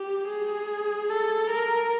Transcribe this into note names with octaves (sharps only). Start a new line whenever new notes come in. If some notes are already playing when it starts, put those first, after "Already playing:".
Already playing: G4
G#4
A4
A#4